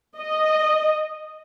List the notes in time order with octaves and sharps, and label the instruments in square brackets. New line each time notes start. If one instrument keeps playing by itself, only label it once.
[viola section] D#5